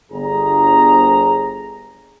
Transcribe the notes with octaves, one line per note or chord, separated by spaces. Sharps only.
G1 G#4 A#5